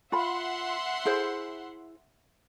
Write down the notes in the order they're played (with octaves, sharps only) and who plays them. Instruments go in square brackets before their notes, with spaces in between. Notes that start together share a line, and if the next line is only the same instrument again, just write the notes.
[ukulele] F4 B5 [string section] E5 F#5 C6
[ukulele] E4 G#4 C5